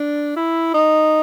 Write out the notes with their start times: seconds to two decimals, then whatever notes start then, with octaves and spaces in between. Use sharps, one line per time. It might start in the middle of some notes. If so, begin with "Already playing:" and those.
Already playing: D4
0.36 E4
0.74 D#4